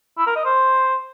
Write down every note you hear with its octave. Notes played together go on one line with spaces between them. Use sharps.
E4
A#4
D#5
C5